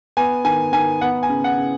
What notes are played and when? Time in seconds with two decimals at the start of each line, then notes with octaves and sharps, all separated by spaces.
0.17 B3 G#5
0.45 D#3 G#5
0.73 D#3 G#5
1.01 B3 F#5
1.23 G#5
1.29 C#3
1.44 F#5
1.58 C#3